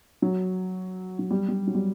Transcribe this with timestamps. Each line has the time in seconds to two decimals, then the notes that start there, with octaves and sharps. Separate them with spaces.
0.22 F#3
1.19 F#3
1.31 G3
1.48 G3
1.67 F#3
1.75 G3